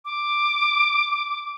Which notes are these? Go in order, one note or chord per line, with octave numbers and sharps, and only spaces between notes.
D6